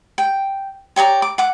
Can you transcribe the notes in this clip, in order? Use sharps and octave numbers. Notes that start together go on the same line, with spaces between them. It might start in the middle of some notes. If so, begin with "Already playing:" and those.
G5
G4 C#5 D5 A#5
D6
F#5 D6